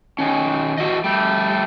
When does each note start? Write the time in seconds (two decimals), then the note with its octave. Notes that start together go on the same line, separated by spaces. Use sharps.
0.19 D#3 C#4
0.78 E3 F#4 D5 D#5
1.04 G3 A3